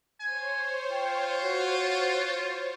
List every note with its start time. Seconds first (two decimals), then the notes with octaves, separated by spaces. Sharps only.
0.20 C5 C#5 G#5
0.91 F4 G5
1.44 F#4